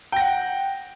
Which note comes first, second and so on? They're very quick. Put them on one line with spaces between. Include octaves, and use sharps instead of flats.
G5 A#6 F#5